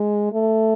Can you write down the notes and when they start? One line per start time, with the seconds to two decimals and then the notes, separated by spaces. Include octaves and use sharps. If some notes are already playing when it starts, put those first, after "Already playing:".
Already playing: G#3
0.33 A3